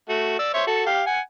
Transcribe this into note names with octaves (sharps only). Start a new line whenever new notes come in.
A3 F#4
D5 E6
C5 C#5 E5
F#4 A4
G4 F5
F#5 G#5